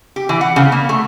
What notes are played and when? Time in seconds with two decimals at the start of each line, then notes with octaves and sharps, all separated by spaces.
0.16 G4
0.29 E3
0.41 F#5
0.56 C#3
0.72 A#3
0.89 A3